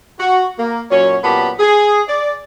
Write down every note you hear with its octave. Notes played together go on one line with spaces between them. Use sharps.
F#4
A#3
F#2 A#2 F#3 C#4 C#5
F#2 A#2 B3 G4 A5 B5
G#4
D5